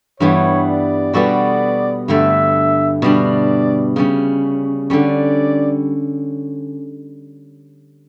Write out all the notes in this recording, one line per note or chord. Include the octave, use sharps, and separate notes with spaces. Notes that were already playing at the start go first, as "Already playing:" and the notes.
G2 E3 G3 B3 C#5
D5
B2 G3 B3 F#4 A4 D5
G2 D3 A3 E5
B2 G3 D4 D5
C#3 G3 C#4
D3 G3 C#4 D5